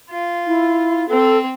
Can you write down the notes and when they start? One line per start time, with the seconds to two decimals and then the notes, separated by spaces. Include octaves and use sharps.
0.11 F4
0.47 E4
1.09 C4 A4